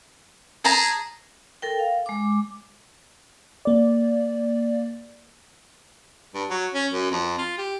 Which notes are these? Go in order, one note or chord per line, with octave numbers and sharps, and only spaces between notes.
G#4 A5 A#5
A4 A#4 G5
F5
G#3 D6
A#3 D5
G2
F#3
C#4
F#2
F2
F4
G4